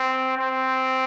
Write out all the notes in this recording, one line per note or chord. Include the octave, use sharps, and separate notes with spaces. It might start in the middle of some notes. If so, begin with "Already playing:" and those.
Already playing: C4
C4